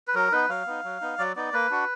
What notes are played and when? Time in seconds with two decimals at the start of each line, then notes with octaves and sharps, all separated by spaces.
0.08 B4
0.14 F#3 A#4
0.32 B3 D#4 B4
0.49 F#3 F5
0.67 B3 D#4
0.84 F#3
1.01 B3 D#4
1.18 F#3 D5
1.36 B3 D#4 D5
1.53 A#3 B4
1.71 D4 F#4